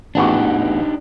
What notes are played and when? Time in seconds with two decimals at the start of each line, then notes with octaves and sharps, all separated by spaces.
0.15 A1 E2 D4 D#4 F#4 G4